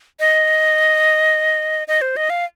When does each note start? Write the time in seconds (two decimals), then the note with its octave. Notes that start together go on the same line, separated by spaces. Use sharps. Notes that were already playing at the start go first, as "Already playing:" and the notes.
0.20 D#5
1.88 D#5
2.01 C5
2.16 D#5
2.30 F5